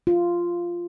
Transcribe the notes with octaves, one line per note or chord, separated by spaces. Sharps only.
F4